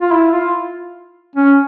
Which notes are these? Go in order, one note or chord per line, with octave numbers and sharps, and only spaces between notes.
F4
E4
F4
C#4